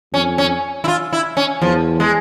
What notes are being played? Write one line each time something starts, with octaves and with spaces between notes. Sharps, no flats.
F2 C#4
C#4
E4
F4
E4
C#4
E2 F3
G#3